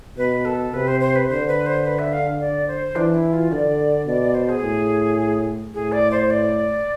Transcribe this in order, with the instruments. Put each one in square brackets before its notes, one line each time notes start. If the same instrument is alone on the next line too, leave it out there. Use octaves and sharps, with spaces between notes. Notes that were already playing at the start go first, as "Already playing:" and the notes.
[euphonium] B2 [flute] B4
[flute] A4
[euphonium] C3 [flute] B4
[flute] C5
C5
B4
[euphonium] D3 [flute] C5
[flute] B4
C5
B4
E5
F5
D5
C5
[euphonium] E3 [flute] D4
[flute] E4
F4
[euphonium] D3 [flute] D5
[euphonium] B2 [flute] D5
[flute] D5
C5
G#4
[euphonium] A2
[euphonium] A2 [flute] G#4
[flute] D5
C5
D5